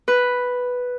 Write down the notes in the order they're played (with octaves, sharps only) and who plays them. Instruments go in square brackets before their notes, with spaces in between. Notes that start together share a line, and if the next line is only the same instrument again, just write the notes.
[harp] B4